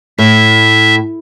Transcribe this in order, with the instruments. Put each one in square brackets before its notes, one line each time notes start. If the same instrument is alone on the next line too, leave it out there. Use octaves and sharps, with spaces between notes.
[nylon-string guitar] A2 [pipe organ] E5